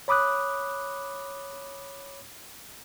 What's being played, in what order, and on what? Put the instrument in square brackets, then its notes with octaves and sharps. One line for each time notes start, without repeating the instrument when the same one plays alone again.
[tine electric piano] C#5 B5 D6 D#6 F#6